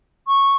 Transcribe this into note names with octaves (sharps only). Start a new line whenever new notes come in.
C#6